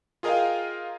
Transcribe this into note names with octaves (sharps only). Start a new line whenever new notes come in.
F4 G#4 A#4 D#5 F5 G5